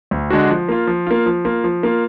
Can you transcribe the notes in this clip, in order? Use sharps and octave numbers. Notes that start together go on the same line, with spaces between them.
D2
D3 G#3 D4 F#4
F3
A#3 F4
F3
A#3 F4
F3
A#3 F4
F3
A#3 F4